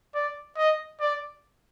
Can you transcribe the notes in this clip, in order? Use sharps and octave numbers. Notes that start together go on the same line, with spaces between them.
D5
D#5
D5